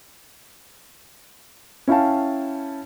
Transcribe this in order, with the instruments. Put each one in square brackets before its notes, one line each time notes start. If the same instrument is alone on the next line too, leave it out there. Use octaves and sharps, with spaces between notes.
[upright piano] C#4 E4 F5 G5 A5